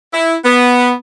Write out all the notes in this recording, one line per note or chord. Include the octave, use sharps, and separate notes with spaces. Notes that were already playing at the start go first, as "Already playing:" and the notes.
E4
B3